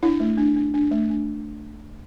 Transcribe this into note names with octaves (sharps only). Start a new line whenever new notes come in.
D4 E4
A3
D4
D4
D4
A3
D4